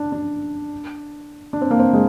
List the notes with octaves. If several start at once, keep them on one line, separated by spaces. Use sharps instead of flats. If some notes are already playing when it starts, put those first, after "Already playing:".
Already playing: D4
D4
D4
C4
A#3
C4
G#3